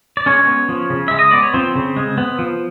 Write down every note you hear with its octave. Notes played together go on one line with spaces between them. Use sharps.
D5
G#3 C#4 C#5
B3
F3
C#3
G#3 E5
D#5
B3 D5
C#5
F3 C4 C5
C#3
G#3
B3
F3